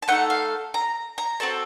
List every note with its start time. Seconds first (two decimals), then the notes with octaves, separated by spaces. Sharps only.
0.02 A5
0.08 A3 D#4 A4 F#5
0.30 F5
0.74 A#5
1.18 A#5
1.40 C4 F#4 A4 A5